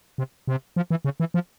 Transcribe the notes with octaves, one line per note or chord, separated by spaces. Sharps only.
C3
C3
F3
E3
C#3
E3
F3